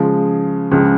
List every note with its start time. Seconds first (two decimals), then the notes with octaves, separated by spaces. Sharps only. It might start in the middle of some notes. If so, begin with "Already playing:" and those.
Already playing: C#3 F3 G#3
0.72 C#2 C#3 F3 G#3